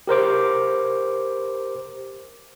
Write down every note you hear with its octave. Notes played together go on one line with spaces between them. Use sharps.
G4 A#4 C5 D6